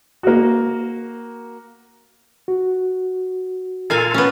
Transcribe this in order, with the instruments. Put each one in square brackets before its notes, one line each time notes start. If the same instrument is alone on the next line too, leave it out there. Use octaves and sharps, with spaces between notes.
[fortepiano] A#3 F#4
[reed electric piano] F#4
[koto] A#2 F5 G#5 [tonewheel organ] F4 A4
[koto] B3 C#4